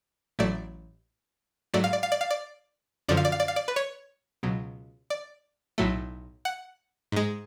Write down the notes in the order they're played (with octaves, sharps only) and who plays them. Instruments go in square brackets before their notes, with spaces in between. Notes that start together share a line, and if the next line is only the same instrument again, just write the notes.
[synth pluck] A1 A2 F#3 A3 D5
G#2 F#3 A3 D5
F5
D5
F5
D5
F5
D5
F#2 D3 F3 D5
F5
D5
F5
D5
F5
D5
B4
C#5
C#2 B2 F#3
D5
B1 A2 F#3 A3
F#5
G#2 G#3